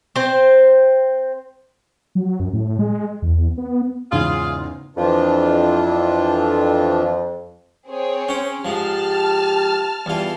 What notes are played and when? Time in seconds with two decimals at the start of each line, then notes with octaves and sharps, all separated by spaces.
0.16 C4 C5
2.15 F#3
2.40 F#2
2.53 A2
2.79 G#3
3.22 E2
3.58 B3
4.12 E2 G#2 C#3 F4 G#4
4.96 F2 E3 D4 F4
7.87 C4 G#4 C#5
8.29 C#4 G5
8.65 G#2 F3 G4 A5 F6
10.06 E2 G3 F4